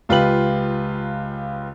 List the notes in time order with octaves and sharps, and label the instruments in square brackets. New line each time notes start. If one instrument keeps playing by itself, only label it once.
[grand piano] C#2 F4 G4 B4 F#7